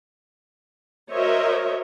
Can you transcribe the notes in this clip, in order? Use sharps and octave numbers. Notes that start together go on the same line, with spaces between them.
F#4 A#4 C5 C#5 D#5 E5